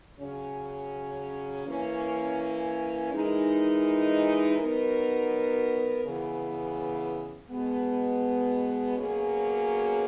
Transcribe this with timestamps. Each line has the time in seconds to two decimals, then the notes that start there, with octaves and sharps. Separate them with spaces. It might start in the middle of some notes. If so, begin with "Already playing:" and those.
0.19 C#3 F#3 C#4
1.65 E3 A#3 C#4
3.11 E3 G#3 D#4 A#4
4.58 F#3 B3 D#4 A#4
6.04 C#3 E3 B3
7.50 B2 G#3 B3
8.97 B2 F#3 A#3 C#4 G#4